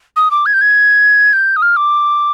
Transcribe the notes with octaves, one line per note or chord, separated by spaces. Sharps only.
D#6
D6
G#6
G6
G#6
G6
D#6
F6
D6